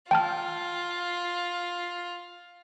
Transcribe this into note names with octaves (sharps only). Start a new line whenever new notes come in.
F4 G5 A5 F6